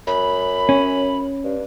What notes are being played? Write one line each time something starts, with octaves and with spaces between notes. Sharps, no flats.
F#2 B5
C#4
G2